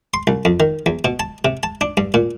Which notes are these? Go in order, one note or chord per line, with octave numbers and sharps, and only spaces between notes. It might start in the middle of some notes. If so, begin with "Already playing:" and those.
C6
C2
F2
D#3
E2
B2
A5
C3
A5
D4
G2
A#2